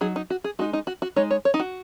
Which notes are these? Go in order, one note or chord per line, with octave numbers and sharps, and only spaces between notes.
F#3 D#4 G#4
D#4
F#4
G#4
G#3 D#4 F#4
D#4
F#4
F#4
G#3 D#4 C#5
C#5
C#5
D#4
F#4